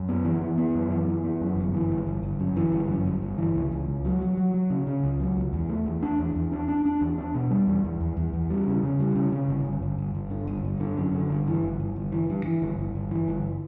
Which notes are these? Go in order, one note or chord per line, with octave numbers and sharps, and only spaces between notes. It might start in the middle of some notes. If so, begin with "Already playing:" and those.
Already playing: F#2
B3
E3
E3
B3
F#2
E3
E3
B3
F#2
G1
E3
G1
G1
G1
F#2
E3
G1
F#2
G1
G1
E3
C#2
C#2
C#2
F#3
F#3
F#3
F#3
C#3
C#3
C#2
F#3
C#2
E2
A3
E2
D4
E2
E2
D4
D4
D4
E2
D4
B2
G3
E2
E2
E2
E2
E2
G3
C#3
C#3
G3
C#3
C#3
G1
G1
G1
G1
G1
D3
G1
G1
D3
F#2
D3
G1
E3
G1
G1
G1
E3
G2
E3
G1
G1
G1
E3
G1